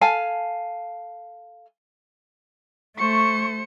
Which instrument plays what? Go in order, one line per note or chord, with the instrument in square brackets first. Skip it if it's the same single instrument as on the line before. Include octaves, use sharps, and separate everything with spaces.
[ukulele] A4 F5 G#5 A5
[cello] A3 [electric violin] C5 C#7 [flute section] C#6